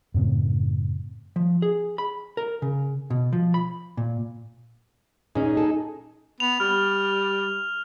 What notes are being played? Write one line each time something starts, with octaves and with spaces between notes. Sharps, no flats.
F#2 A2 C#3 C4
F3
G#4
B5
A#4
C#3
B2
F3
B5
A#2
A#2 C#4 D#4 G#4
A4
B3 F7
G3 F6